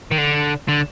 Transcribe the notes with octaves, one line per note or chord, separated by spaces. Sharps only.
D#3
D3
D3